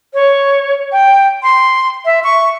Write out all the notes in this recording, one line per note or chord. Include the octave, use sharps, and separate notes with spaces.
C#5
G5
C6
E5
C#6